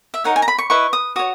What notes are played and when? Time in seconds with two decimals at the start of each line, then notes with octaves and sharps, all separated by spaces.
0.14 E5
0.24 D#4 A#4 C#5 F#5
0.36 G#5
0.42 A#5
0.48 B5
0.58 C#6
0.70 E4 B4 D#5 C#6
0.93 D#6
1.16 F#4 C#5 D#6